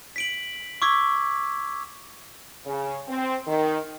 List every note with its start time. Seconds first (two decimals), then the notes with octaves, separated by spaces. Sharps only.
0.16 B6 D7 F#7
0.82 C#6 D6 E6 G#6 B6
2.65 C#3
3.08 C4
3.47 D#3